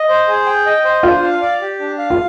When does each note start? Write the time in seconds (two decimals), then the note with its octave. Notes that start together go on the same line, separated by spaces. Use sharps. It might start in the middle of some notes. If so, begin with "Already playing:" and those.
Already playing: D#5
0.09 C5
0.28 G#4
0.46 G5
0.66 D#5
0.85 C5
1.03 D4 F4
1.23 F5
1.42 D5
1.61 G4
1.79 D4
1.98 F5
2.10 F4